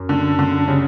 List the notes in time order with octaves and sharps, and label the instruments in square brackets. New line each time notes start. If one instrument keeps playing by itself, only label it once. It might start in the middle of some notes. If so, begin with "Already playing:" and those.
Already playing: [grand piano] F#2
[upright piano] D3
D3
C#3